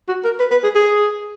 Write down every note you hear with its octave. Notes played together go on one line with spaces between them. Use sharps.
F#4
A#4
B4
B4
G#4
G#4